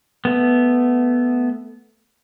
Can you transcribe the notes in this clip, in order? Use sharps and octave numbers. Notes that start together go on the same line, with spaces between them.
A3 B3